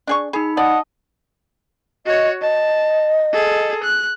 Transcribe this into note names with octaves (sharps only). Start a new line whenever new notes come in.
D4 G#4 C#6
D#4 G#4 B5
D5 D#5 F#5 A5
F#4 C#5 D#5
D#5 A5
G#4 A4
F#6